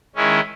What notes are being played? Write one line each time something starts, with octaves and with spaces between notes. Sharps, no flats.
D#3 G#3 C#4 E4